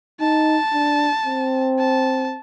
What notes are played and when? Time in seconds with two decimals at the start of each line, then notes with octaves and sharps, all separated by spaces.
0.20 D#4 A5
0.73 D4
1.26 C4
1.79 A5